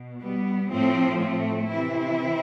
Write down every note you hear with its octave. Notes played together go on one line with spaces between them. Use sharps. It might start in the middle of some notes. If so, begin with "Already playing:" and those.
Already playing: B2
G3 B3
A2 F3 A3 C4
A3 C4
C3 E3 C4 E4